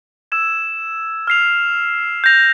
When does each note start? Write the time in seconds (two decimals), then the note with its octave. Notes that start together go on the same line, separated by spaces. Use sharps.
0.32 E6 G#6 E7
1.27 F6 C7 F7
2.24 G6 A#6 F7